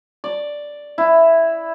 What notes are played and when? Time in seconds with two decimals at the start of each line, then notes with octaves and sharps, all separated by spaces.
0.24 D5
0.98 E4